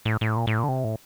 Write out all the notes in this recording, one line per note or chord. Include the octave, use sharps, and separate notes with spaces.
A2
A2
A#2
A2
A#2
D3
C3
A2